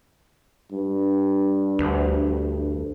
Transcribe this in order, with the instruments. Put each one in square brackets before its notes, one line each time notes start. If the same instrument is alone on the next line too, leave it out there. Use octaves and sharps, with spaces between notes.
[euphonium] G2
[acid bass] D2